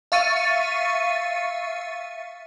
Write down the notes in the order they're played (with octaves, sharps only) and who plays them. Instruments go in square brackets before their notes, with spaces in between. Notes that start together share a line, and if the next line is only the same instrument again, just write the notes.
[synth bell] E5 F5 C#6 A6 C#7 D#7